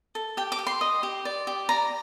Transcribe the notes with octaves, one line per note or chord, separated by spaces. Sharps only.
A4
G4 G5
D6
G4
C6
D#5
G4
D5
G4
D5 A#5